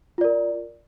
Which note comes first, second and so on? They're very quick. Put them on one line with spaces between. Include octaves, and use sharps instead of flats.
F4 D5 A#4